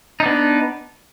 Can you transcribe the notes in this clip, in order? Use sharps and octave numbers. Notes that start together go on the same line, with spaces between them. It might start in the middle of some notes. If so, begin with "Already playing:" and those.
B3 D4 D#4